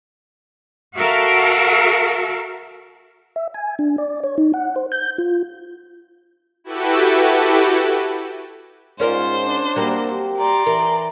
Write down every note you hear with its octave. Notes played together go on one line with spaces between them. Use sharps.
F#4 A4 A#4 E5 F5
E5
G#5
D4
D5
C#5
D#4
F#5
C5
G6
F4
E4 F#4 G4 A4 B4
G#2 C#4 F4 A#4 C5 D5
D4
F#3 G3 A#3 C4
G4
D5 A#5 C6
E3 A#4